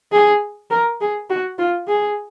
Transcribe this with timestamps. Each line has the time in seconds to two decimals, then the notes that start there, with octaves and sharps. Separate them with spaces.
0.12 G#4
0.71 A#4
1.01 G#4
1.30 F#4
1.58 F4
1.88 G#4